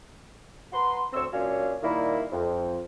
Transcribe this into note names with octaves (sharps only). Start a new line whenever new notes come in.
B4 F#5 A#5 C6
D2 C4 C#6 E6
A#2 F#3 C#4 D4 C#5 F5
A#2 D#3 G3 A#3 E4
F2